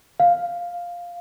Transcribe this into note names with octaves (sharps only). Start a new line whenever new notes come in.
F5